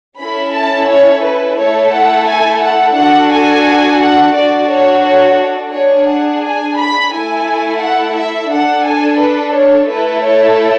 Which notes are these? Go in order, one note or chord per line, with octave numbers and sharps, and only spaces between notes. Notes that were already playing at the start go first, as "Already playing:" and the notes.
C#4 E4 A4 B5
A5
C#5
B4
A3 E4 A4 C#5
F#5
G#5
F#5
D4 F#4 A4 F#5
G#5
F#5
D4 F#4 A4 D5
C#5
C#5
D4 G#4 C#5
F#5
G#5
B5
A3 E4 A4 G#5
F#5
E5
D4 A4 F#5
G#5
B4
C#5
A3 E4 A4 B4
C#5